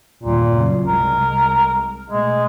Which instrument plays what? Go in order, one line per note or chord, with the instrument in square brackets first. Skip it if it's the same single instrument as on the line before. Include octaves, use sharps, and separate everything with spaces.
[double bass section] G1 D#2 [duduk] A#2
[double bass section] F#2 C#3
[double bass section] C2 G#3 [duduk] A#4
[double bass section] B2 A3 [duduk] G#3